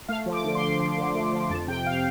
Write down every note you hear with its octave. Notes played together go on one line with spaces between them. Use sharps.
A3 F5
F3
D6
D3
C6
F3
F3
D3
A3
F3
F2 A5
C3 G5
F5